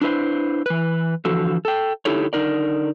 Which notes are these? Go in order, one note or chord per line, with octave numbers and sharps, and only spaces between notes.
D4 E4 B4 C5
E3 B4
D3 E3 F3 F#4 A4
A4 G5
D3 D#4 E4 G4 A4 C#5
D3 D#4 A#4 D5